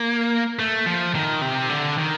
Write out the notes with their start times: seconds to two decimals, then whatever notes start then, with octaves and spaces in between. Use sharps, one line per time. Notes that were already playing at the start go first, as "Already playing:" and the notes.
Already playing: A#3
0.59 A3
0.86 F3
1.15 D#3
1.42 C3
1.69 D3
1.98 D#3